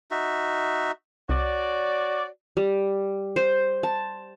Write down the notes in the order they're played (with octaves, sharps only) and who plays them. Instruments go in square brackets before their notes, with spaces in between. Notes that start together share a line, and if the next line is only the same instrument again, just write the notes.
[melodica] D#4 F#4 E5
[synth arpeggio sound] C2 [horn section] F#4 C#5 D5
[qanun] G3
C5
A5